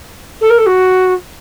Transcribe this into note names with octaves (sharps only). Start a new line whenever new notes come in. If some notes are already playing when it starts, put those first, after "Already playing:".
A4
A#4
A4
F#4